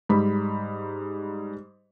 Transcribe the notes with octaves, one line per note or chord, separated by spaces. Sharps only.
G#2 G3 B5